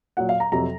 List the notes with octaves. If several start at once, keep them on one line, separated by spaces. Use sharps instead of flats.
A#2 F#3 F#5
F5
A#5
F2 C3 F#3 A#5